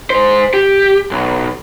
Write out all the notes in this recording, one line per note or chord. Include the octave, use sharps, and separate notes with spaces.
G#3 C5
G4
B1